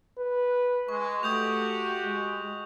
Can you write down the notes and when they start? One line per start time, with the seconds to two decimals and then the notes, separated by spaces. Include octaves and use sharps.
0.19 B4
0.89 G#3 C#6
1.23 A3 F#4 G4 D#6 G6 F7
2.04 G#3